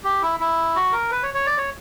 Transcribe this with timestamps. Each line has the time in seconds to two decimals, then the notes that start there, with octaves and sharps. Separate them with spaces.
0.04 G4
0.22 E4
0.40 E4
0.76 F#4
0.92 A#4
1.11 B4
1.23 C#5
1.34 C#5
1.46 D5
1.58 C#5